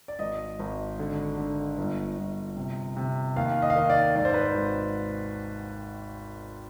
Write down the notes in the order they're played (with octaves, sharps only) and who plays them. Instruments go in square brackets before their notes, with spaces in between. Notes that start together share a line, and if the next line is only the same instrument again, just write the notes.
[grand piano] D5
G#1 D#5
G#1
D3
D3
G1
G1
C3
C3
D#2 F5
D#5
F5
D#3 D#5
D5
G#2 D5
C5
B4
C5
G#1